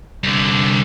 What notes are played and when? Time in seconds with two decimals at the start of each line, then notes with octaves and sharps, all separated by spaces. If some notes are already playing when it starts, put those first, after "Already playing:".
0.24 C2 D3